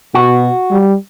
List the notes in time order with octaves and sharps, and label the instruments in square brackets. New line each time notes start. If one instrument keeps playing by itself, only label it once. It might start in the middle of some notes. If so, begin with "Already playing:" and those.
[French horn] B2 [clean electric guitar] F#4
[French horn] G3